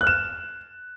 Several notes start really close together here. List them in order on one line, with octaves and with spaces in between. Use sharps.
F#6 F6 E7